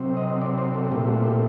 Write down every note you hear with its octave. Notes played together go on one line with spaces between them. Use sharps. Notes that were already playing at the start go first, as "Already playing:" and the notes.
Already playing: C3 F#3 C4
D#5
D5
C5
A4
A#2 A3 C4 G4
F#4
G4